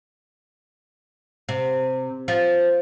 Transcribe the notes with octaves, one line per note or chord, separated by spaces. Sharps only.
C3
F3